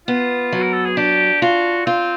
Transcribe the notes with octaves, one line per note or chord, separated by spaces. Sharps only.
B3 F4
F#3
A#4
A4
G#4
D4 G4
F4 F#4
C4 F4